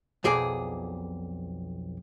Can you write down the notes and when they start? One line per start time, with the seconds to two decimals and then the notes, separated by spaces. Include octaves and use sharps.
0.24 B1 F2 G#4 D5